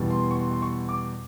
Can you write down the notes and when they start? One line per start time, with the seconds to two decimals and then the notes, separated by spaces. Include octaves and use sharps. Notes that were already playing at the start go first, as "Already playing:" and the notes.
Already playing: E2 B2 G3
0.10 C6
0.31 C#6
0.37 C6
0.51 C6
0.62 C#6
0.89 D6